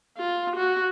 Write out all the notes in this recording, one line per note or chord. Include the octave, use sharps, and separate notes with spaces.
F4
F#4